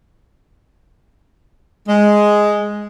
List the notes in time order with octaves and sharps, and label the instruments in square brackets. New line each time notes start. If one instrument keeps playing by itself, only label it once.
[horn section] G#3